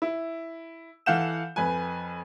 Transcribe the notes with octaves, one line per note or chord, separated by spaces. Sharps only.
E4
E3 A4 F5 F#5 G6 E7
F2 B4 G#5